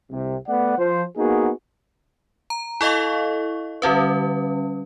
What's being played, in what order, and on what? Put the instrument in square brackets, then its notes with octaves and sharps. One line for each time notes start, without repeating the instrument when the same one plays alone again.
[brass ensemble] C2 C3
A3 B3 D5 F#5
F3 C5
A#3 B3 D#4 F#4 G#4
[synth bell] A#5
E4 A4 D#5 F5 C#6
D3 G3 C#4 B4